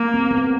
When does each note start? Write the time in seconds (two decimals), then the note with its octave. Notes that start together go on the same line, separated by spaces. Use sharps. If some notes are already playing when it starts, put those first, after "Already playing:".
Already playing: A#3
0.14 C4
0.31 B3
0.37 C4